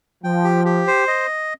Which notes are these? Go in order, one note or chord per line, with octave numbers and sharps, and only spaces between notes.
F3 G5
G4
G4
C5
D#5